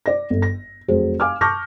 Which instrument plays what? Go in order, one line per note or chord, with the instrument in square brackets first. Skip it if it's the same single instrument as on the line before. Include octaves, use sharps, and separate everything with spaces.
[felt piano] D5 A#6
G1
A#6
F1 F#3 G#4 C5
F5 G#5 D6 F6
A5 C#6 D6 F6 G6 A#6